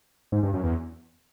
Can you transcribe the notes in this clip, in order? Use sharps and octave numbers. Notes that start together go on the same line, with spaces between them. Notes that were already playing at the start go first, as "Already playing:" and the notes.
G#2
G2
F#2
E2